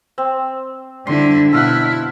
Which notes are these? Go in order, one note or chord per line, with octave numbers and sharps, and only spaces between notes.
C4
D3 G3 D4 E4 C6
B2 E4 A4 F5 F#5